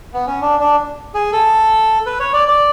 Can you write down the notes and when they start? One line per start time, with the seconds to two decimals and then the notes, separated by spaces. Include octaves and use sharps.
0.14 B3
0.27 C#4
0.41 D4
0.60 D4
1.14 G#4
1.33 A4
2.06 B4
2.20 C#5
2.33 D5
2.48 D5